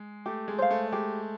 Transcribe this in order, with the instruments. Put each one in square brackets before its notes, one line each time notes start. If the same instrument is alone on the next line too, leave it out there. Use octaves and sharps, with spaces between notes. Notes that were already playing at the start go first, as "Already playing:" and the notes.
Already playing: [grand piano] G#3
[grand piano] A3 [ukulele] G4
[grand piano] G#3
[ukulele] C5 F5
[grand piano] A3
[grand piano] G#3 [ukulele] G4